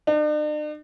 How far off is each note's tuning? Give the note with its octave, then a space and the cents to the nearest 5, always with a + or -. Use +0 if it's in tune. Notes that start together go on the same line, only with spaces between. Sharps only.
D4 +45